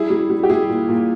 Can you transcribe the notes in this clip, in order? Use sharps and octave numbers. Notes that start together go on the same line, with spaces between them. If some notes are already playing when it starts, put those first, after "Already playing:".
Already playing: G3 E4 G#4
G3
G3
G4
G3 E4 G#4
A#2
A#2